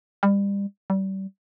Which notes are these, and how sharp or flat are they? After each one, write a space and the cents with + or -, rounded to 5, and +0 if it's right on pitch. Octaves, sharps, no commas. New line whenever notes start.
G3 +30
G3 -30